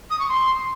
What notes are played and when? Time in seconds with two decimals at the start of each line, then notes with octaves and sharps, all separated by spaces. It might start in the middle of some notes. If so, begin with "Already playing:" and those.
0.10 D#6
0.19 C#6
0.28 C6